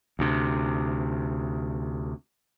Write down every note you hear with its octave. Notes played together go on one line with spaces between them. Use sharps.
D2 C3